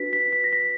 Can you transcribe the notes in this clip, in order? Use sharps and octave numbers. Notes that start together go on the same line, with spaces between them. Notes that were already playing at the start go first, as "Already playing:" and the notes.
Already playing: D4 F#4 B4 B6
B6
B6
A#6
B6